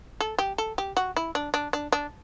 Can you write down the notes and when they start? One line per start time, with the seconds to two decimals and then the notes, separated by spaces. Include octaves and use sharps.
0.20 A4
0.38 G4
0.58 A4
0.78 G4
0.97 F#4
1.16 E4
1.35 D4
1.54 D4
1.73 D4
1.92 D4